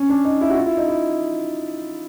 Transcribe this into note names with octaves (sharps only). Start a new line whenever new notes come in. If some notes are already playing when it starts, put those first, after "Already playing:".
Already playing: C#4
D4
D#4
E4
F#4
F4
E4
D#4
E4